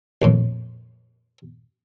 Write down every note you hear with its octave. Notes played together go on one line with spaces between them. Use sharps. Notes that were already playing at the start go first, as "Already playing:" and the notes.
A#1 F2 A2